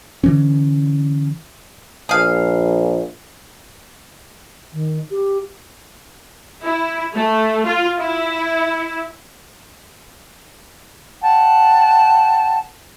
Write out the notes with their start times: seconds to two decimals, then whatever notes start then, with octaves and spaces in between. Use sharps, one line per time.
0.24 D3 E3 C#4
2.09 A#1 G#4 F5
4.73 D#3
5.11 G4
6.62 E4
7.14 A3
7.66 F4
7.99 E4
11.21 F#5 G5 A5